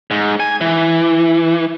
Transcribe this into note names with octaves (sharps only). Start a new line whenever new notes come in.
G#2
G#5
E3